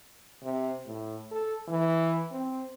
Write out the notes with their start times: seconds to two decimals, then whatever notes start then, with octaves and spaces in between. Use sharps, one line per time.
0.43 C3
0.86 A2
1.31 A4
1.68 E3
2.31 C4